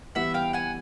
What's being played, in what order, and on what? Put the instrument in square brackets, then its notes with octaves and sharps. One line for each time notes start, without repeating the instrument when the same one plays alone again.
[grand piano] E3 G3 B3 E4 [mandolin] E5 F#5
[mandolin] F5 G5
F#5 G#5